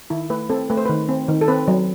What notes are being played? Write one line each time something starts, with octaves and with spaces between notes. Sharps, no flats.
D#3 E4
A3 B4
C4 A4
A3 B4
C5
D#3 B4
C4
D#3
A4
C4 B4
F#3